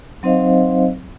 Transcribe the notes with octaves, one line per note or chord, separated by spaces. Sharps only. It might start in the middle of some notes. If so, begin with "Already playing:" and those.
F#3 C4 D#4 C5 D#5 F5